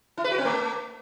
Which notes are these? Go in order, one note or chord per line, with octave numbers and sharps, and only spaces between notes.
E4
B4
F#4
C4
A3